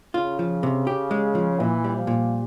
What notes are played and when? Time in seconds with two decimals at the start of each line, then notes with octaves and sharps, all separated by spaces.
0.14 C#3 F4
0.39 F3
0.63 C3
0.87 G4
1.11 G#3
1.35 F3
1.59 A#2 E3
1.84 G3
1.96 F3
2.07 A#2